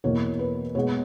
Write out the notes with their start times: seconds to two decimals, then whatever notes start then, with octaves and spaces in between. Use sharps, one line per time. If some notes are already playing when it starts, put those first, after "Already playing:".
0.04 E2 B2 A#3 C#5
0.39 B4
0.75 B2 G#3 B3 C#5